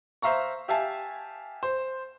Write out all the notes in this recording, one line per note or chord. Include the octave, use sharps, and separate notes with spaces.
C5 E5 F5 A#5 C#6
G4 E5 F5 G#5 A5
C5